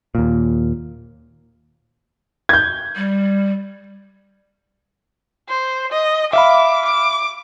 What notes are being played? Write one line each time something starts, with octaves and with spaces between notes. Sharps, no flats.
D#2 A#2
G6 G#6
G3
C5
D#5
E5 F5 B5 D6
D6